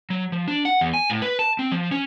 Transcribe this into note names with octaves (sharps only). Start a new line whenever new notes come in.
F#3
F3
D4
F#5
E2
G#5
A2
B4
A5
C4
F3
C#4